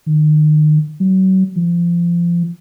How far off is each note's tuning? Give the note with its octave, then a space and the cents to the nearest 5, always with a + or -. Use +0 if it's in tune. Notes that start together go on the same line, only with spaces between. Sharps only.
D#3 -35
F#3 +35
F3 -25